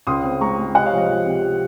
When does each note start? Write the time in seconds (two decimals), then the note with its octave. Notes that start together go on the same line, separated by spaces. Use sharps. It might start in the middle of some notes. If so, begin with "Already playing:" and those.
0.07 C#2 C6 D#6
0.24 C4
0.41 G#3 A#5 C#6
0.58 G#3
0.75 C3 D#5 F#5
0.86 C#5 F5
0.92 F3
0.97 C5 D#5
1.09 F3
1.26 C3